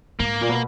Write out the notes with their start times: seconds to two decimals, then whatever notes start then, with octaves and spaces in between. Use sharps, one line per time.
0.20 G#2 A#3
0.41 A#2
0.49 B2